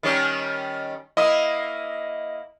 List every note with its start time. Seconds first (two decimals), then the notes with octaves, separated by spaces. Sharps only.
0.03 D#3 G3 C#4
1.17 A#3 E4 D#5 D#6